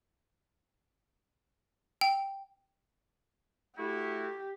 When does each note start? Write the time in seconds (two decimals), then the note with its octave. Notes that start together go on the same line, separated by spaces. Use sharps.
2.01 G5
3.77 A3 E4 F#4 G4